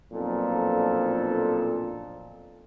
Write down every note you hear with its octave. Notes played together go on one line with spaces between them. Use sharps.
B1 F2 A#2 F3 D4 A4